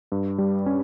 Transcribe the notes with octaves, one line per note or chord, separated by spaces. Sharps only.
G2
G3
C#4